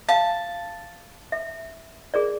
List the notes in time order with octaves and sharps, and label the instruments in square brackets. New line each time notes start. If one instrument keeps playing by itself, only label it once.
[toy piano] F5 [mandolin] A5
[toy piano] E5
G#4 A#4 D5